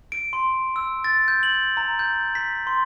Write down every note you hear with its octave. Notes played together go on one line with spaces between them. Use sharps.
D7
C6
E6
A6
G6
F#7
A#5
G6
B6
C6